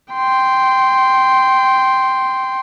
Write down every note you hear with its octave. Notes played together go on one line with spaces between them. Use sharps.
G5 C6